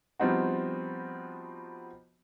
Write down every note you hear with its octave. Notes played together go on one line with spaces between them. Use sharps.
F3 G3 B3 C4 D#4 F#4